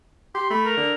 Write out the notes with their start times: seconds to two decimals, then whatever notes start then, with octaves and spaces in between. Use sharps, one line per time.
0.35 G4 C6
0.50 A3 B5
0.65 A#4
0.77 D3